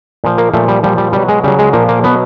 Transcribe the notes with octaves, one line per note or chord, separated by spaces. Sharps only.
A#2 F3
A#3
A#2 F3 A3
G3
A#2 F3 G3
G3
B2 F#3 G3
G#3
C#3 F#3 G3
G#3
A#2 F3 A#3
A#3
B2 F#3 B3